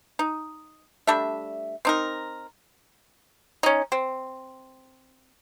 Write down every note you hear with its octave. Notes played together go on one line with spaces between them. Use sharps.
D#4
G3 A3 D4 E5
C4 D#4 A#4
C#4 D#4
C4